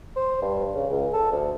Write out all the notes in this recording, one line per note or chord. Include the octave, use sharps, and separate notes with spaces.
C5
G2
C#3
C#2
A4
D2